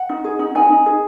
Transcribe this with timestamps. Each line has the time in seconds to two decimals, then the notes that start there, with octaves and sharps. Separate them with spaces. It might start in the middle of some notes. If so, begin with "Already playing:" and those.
Already playing: F#5
0.09 D#4
0.24 G#4
0.39 D#4
0.55 D#4 G#5
0.70 D#4
0.86 G#4